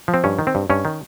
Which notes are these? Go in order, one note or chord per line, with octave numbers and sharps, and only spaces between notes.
F3
C4
G2 C#4
D#3
C4
G2
G2 C#4
D#3